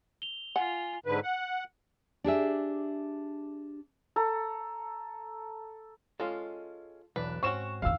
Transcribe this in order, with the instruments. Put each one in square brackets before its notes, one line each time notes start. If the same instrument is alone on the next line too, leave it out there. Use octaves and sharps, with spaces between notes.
[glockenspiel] F7 G7
[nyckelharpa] F4 [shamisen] F#5 [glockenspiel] G#5
[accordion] G#2 D3 B4
F#5
[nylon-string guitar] D4 G4 G#4 E5
[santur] A4 A#5
[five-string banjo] G#3 C#4 [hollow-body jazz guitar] F4 A4
[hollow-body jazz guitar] B1 E2 [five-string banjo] D4 B4
[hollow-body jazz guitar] G#2 [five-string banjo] C4 C#4 F#4 [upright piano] C#6 E7
[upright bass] F2 D#3 [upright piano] F5 E6